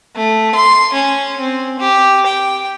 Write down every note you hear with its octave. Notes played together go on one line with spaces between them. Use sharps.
A3
C6
C#4
C4
G4
G5